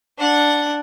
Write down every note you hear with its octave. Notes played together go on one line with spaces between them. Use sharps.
D4 F#5